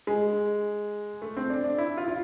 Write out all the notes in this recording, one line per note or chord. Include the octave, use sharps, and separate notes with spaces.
G#3
A3
C4
D4
D4
E4
F4
F4